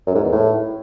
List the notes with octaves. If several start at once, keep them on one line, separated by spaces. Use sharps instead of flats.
F#2
G#2
E2
A2